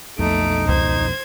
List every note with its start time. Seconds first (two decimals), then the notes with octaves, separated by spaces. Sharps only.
0.19 B1 F2 B2 A3 D#4 D7
0.69 C#2 C5 G#6